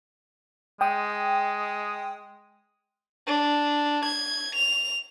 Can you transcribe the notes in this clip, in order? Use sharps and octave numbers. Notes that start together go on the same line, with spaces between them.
G#3 G5 D#6
D4
G#6
F7